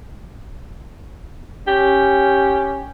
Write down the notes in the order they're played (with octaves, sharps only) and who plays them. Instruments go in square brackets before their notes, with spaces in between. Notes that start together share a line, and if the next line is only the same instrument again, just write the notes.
[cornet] C#4 [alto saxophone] G4